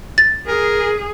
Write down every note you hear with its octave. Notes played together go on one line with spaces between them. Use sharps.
A6
G#4 A#4